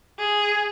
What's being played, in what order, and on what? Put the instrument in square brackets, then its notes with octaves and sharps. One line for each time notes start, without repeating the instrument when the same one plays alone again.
[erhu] G#4